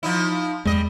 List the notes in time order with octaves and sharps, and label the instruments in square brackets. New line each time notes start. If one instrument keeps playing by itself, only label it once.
[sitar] F3 D#4 E4
[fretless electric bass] E2 G#3 [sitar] G3 D#5